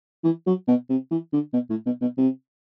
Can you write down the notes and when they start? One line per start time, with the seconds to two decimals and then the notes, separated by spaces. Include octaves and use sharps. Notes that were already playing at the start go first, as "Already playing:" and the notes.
0.24 E3
0.47 F#3
0.68 B2
0.90 C3
1.11 E3
1.33 D3
1.53 B2
1.70 A2
1.86 B2
2.01 B2
2.18 C3